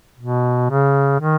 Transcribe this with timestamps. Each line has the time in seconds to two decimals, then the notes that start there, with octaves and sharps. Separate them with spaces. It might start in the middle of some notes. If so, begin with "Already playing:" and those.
0.19 B2
0.70 C#3
1.20 D#3